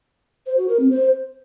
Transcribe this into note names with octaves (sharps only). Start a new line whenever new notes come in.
C5
F#4
A#4
C4
C5